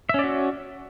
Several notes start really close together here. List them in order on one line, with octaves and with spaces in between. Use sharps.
E5 C#4 D5 F#4